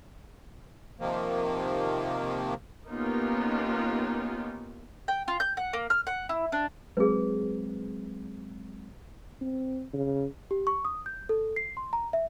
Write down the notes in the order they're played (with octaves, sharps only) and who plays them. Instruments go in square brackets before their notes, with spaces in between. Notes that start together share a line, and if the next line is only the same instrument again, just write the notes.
[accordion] C3 D#3 F3 A#3
[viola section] A#3 B3 C#4 D#4 F4 G4
[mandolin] G5
F4
G6
F#5
A#3
F6
F#5
E4
D4
[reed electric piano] F#3 G#3 C4 [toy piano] G#4 B4
[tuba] C4
C#3
[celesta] G4
C#6
D#6
G6
A4
C7
C6
A#5
E5